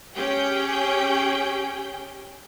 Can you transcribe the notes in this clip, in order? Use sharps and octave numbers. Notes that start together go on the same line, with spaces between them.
C#4 G4 G#4 G5 G6